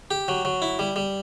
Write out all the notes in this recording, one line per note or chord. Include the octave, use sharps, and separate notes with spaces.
G4
F#3
F#3
E4
G3
G3